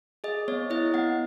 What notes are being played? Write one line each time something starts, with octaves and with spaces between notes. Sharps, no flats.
G#4 D#5
B3 C#5
E4 D#5
B3 F#5